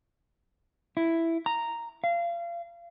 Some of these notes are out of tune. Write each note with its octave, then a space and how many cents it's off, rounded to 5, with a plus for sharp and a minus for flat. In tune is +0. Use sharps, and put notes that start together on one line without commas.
E4 +5
A#5 -5
F5 -30